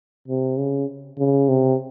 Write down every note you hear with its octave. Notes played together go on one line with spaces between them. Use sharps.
C3
C#3
C#3
C3